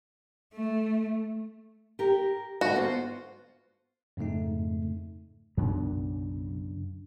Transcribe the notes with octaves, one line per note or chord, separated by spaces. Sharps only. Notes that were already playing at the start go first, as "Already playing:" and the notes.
A3
G4 A#4
G#2 D3 F#4
B3 F4 C5
F2 G#2 C#3 A3 D#4
B1 F#2 C#3 D4